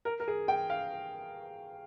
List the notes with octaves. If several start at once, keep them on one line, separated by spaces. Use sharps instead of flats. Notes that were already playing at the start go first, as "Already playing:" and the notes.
A#4
A#4
G#4
G5
F5